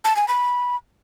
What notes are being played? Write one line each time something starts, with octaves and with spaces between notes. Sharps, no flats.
A5
G#5
B5